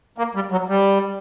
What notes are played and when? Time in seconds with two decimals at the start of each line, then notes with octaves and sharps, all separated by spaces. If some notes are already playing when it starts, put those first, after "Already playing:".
0.18 A#3
0.35 G3
0.52 F#3
0.69 G3